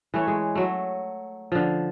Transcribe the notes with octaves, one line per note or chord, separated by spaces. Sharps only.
E3 A3 C#5
G#3
F#3 A3
D3 F3